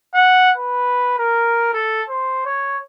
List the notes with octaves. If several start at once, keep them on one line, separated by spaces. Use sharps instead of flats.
F#5
B4
A#4
A4
C5
C#5